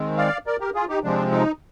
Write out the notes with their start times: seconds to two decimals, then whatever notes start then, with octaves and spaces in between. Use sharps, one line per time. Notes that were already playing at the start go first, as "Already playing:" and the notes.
Already playing: D#3 G#3 C4
0.17 D5 F5
0.46 A#4 D5
0.60 G4 A#4
0.74 F4 G#4
0.89 D#4 G4
1.03 C3 F3 G#3 C4 D4
1.32 D#4